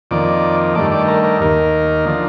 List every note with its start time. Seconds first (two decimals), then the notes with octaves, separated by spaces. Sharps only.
0.11 F2 D#3 A#3 D5
0.75 G2 D#3 A3 D5
0.91 D5
1.08 A#4
1.24 A#4
1.40 D#2 D#3 A#3
2.06 D3 F3